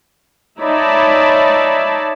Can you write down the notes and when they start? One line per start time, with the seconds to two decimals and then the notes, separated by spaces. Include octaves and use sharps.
0.62 D#4 C#5 D5 E5 A5 B5